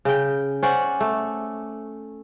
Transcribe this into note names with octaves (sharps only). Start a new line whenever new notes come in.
C#3 G5
C#4 C5 D5 F#5
A3